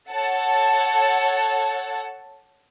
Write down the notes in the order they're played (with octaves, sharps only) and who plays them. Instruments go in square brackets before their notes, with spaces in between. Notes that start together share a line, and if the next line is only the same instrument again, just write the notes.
[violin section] A4 C#5 F#5 A5